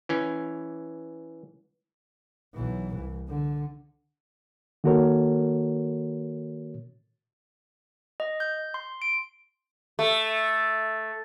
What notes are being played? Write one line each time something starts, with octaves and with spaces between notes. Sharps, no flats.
E3 C#4
B1 E3
C2
D3
D#3 A#3 F#4 A4 A#4 C#5
D#5
G6
C6
D7
A3